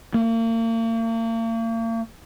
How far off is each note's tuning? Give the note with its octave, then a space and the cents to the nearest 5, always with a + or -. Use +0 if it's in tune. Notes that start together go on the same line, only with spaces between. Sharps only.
A#3 -40